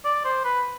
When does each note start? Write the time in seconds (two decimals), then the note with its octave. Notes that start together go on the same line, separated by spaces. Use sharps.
0.05 D5
0.25 C5
0.44 B4